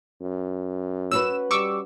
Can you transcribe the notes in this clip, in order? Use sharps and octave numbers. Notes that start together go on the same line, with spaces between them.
F#2
C#4 F#4 B4 E6 E7
G3 C#6 D6 E6